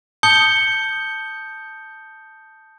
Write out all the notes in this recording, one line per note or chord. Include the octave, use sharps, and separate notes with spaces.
A5 D#6 G6 C#7 G7